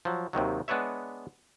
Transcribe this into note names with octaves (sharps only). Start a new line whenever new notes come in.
F3 F#3
D#2 C3 D#3 F#3
G#3 B3 D4 B4 C#5 E5